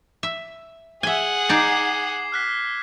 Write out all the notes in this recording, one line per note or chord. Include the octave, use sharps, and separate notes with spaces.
E5
G#4 E5 F#5 G#5 G7
D#4 D5 D6 G#6 C7
F6 F#6 B6